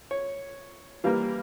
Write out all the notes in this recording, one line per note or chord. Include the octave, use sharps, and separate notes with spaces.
C#5
E3 G3 A#3 F5